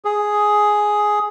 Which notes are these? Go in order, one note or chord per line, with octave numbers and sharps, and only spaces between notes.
G#4